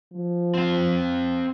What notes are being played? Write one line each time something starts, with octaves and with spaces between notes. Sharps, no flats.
F3
C4 F5